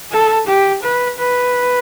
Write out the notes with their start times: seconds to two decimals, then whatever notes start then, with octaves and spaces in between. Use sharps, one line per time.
0.12 A4
0.47 G4
0.83 B4
1.19 B4